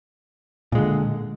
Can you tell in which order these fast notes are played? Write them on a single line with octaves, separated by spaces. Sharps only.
A#2 G#3 D3